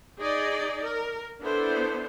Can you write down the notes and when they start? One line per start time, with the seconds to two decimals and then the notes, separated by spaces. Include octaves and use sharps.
0.19 D#4 G#4 D5 D#5
0.84 A#4
1.42 B3 D4 E4 A4 C5